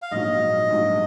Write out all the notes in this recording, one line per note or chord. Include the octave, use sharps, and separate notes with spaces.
F5
A#1 G#2 F#3 D#5
A#1 G#2 F#3